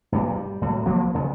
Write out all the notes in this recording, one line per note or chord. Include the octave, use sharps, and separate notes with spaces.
G2 A#2 F#3
G3
A2 F#3
C2 F3 A#3 B3
D2 C#3 B3